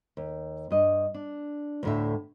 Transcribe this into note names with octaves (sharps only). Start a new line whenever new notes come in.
D#2
G2 D#5
D4
D2 A2 E5